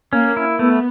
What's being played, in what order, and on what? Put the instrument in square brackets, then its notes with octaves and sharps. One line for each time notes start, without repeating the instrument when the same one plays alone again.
[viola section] A#3 [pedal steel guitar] C#4
[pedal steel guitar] E4
[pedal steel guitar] A3 [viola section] B3